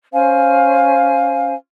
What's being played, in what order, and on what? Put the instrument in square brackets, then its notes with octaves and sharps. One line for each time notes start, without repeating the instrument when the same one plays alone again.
[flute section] C#4 C5 F5 G#5